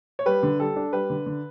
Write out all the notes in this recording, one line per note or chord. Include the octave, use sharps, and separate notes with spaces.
C#5
G3 B4
D3
G3 A4
D4
G3 B4
D3
D3